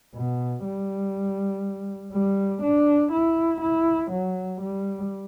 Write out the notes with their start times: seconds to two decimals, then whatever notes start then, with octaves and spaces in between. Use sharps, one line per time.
0.15 B2
0.64 G3
2.12 G3
2.62 D4
3.12 E4
3.61 E4
4.11 F#3
4.61 G3